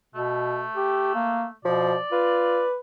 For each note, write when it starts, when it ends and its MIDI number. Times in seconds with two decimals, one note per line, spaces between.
0.15 0.64 47
0.15 1.53 57
0.77 1.15 67
1.15 1.45 58
1.65 1.95 47
1.65 1.95 53
1.65 2.70 74
2.12 2.64 65
2.12 2.77 71